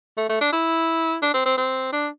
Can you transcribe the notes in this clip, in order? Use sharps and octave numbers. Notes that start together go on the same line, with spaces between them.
A3
A3
D4
E4
D4
C4
C4
C4
D4